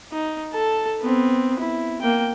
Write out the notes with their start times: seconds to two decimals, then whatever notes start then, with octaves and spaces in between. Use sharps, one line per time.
0.12 D#4
0.53 A4 A5
1.01 B3 C4
1.59 E4
2.01 A#3 G5